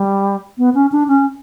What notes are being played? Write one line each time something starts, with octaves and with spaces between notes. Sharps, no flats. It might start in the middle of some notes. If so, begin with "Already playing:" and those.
Already playing: G3
B3
C#4
D4
C#4